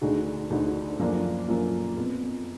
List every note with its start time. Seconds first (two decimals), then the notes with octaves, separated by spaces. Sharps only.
0.01 D2 D3 G#3 D#4 F#4
0.50 D2 D3 G#3 D#4 F#4
0.99 F#2 F3 A#3 D4 F4
1.48 F#2 F3 A#3 D4 F4
1.97 F2 F3 B3